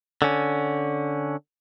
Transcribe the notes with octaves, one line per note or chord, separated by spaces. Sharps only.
D3 C#4